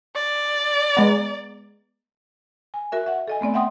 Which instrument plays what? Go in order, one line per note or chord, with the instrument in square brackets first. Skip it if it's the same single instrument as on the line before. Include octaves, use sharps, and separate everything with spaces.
[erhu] D5
[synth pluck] G#3 B3 A#5
[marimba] G#5
F#4 A#4 E5
E5 F#5
A4 D#5 G#5
A3 B3 C4 D5
E5 F#5 G5 C6 D#6